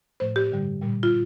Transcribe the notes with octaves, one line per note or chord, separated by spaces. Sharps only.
A2 F3 A3 C5
G4
G2 D3 G3
A#2 G3
F4